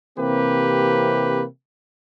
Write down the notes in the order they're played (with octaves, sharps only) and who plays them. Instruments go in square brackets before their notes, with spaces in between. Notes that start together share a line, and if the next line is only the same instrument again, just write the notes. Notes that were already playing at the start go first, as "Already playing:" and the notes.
[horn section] C3 E3 A#3 C4 G4 B4